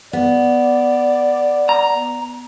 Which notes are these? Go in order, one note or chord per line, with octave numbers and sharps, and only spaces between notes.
B3 D5
A#5